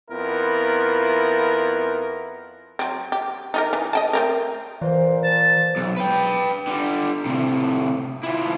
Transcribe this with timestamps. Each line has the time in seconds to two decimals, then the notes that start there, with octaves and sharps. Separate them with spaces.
0.11 F2 B3 E4 F4 A#4
2.79 F#3 C4
3.12 G4
3.54 D#4 F4 A#4
3.73 E3
3.93 D#5 G5 A5
4.13 A3 C4 A#4
4.82 A#2 E3 C5
5.24 C5 A5
5.76 B1
5.96 B4 G5
6.67 D3 G3
7.26 A2 C3
8.23 F3 E4